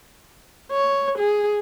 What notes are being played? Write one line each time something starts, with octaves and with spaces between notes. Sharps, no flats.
C#5
G#4